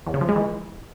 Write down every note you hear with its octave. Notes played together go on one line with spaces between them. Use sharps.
E2
C#3
F3
G#3
E3